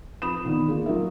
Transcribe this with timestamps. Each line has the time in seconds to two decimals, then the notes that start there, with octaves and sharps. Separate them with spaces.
0.22 F3 C4 B5 D#6 E7
0.45 B2 D3 D#3
0.68 A#3 F4 G#4
0.86 F#3 F4 A#4 E5